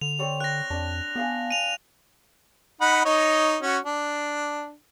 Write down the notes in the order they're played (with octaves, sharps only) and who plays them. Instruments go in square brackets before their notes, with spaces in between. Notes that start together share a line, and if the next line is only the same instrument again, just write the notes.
[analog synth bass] D3 [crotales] F7
[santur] C4 C#5 D5
[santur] G5 [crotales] F#6 A#6
[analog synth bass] F2 [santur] D4
[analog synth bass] B3 [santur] D5 F5 G#5
[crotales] D#7 F7
[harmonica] D#4 F#5 B5
D#4 C#5 D#5
C#4 F#4
D4